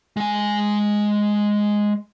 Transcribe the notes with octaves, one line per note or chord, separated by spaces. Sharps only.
G#3 G#5